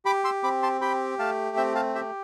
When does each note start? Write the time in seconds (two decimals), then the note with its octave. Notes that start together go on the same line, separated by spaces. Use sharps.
0.05 G4 B5 D6
0.24 C6 E6
0.43 C4 B5 D6
0.63 A5 C6
0.81 G4 G5 B5
1.19 A3 F5 A5
1.57 C4 E5 G5
1.75 F5 A5
1.95 G4 E5 G5